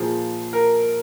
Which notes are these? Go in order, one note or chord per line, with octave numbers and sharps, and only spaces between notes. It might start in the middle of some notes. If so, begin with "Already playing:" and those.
Already playing: A#2 F3 G#4
A#4